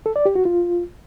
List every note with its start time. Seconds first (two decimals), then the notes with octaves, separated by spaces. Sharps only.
0.06 A4
0.16 D5
0.26 G4
0.35 F#4
0.45 F4